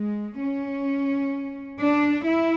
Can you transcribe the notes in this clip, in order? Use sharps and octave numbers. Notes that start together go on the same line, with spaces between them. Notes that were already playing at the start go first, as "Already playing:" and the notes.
Already playing: G#3
C#4
D4
E4